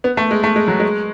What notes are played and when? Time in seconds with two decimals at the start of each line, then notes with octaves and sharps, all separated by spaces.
0.04 B3
0.17 A3
0.31 G#3
0.44 A3
0.56 G#3
0.68 F#3
0.80 G#3